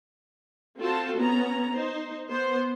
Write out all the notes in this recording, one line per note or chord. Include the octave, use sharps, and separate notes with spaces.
C4 F4 F#4 A4 C5 A5
B3 C#4 A#5
D#4 C5
B3 C5